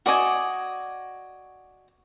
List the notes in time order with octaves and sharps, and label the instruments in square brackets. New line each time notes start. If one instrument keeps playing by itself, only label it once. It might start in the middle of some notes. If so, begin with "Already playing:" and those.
[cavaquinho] F#4 D5 D#5 G#5